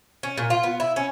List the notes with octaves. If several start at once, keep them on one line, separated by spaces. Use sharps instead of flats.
C#4
A#2
F4
B3
E4
C#4